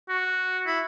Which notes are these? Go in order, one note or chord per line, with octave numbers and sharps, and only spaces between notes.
F#4
E4